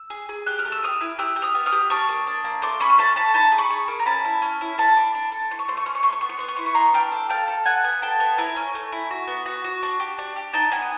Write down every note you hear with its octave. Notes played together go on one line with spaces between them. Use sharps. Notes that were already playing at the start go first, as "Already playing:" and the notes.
Already playing: E6
G#4
G#4
G4 F#6
F6
A3
E6
E4 D#6 F6
E4
G4 E6 F#6
G4
D#6 F6
B3
D#6 F6
G4
D4 C#6 D#6
A#3
D4
A#3
A3 C6 D6
C#4 B5 C#6
C6
A3 A5 B5
A4 A5 B5
D#4 A5 B5
G#4
B5 C#6
G#4
A#3
A#5
C#4 A5 B5
E4
C#4
E4
A4 A5 B5
D4
D4
A4
E4 C6
C#6
A3 C6
C#6
C#4 C6
C#6
A3 C6
C#6
B3 C6
C#6
B3 C6
C#6
E4 C6
C#6
B3 A#5 C6
D4 F5 G5
A4
A4 F5 G5
A4
B3 F#5 G#5
B3
A4 G5 A5
B3
E4 G#5 A#5
C#4
A3
E4
F#4
B3
F#4
F#4
D4
G4
D4
G4
D#4 G5 A5
B3 F#5 G#5